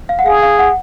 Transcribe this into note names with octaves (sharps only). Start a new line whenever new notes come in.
F5
F#5
G#4 F5
F5
F#5